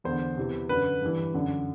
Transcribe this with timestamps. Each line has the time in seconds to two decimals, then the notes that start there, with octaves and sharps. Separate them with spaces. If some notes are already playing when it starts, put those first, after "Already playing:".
0.04 E2 D3 C5
0.37 E2 C3 E3
0.69 F#2 D3 B4
1.01 G2 E3
1.34 F#2 D3